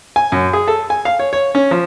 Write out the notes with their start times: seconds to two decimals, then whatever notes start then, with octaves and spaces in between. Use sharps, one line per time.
0.16 G#5
0.32 F#2
0.53 G#4
0.68 A4
0.90 G#5
1.05 F5
1.19 C#5
1.33 C#5
1.55 C#4
1.71 F3